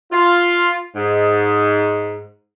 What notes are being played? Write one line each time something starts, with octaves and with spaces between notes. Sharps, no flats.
F4
G#2